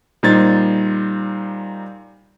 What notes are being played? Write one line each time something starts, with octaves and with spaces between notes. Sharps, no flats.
A#2 G3 D#4 C5 G#6 A6